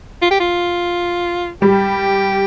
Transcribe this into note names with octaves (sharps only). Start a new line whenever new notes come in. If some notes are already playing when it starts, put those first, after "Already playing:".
F4
G4
F4
G3 G4